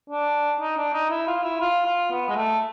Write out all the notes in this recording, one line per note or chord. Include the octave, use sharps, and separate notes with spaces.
D4
D#4
D4
D#4
E4
F4
E4
F4
F4
B3
G#3
A3